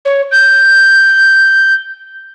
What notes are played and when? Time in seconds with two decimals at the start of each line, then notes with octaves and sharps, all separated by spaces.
0.05 C#5
0.31 G6